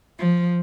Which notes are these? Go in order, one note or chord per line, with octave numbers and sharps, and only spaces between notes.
F3